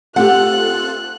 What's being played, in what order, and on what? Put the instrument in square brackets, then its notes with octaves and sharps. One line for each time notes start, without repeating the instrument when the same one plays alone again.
[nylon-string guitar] A3 G4 [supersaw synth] C4 F4 A4 [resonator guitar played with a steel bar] F#5 [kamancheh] F#6